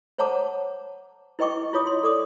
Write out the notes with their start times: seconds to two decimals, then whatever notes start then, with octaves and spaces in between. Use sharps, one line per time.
0.18 C5 C#5 F#5 A5 A#5 D6
1.39 E4 B4 D#5 G5 C#6 D6
1.73 E4 F4 C#5 D6 D#6
1.87 C6
2.03 A4 D5 D6 D#6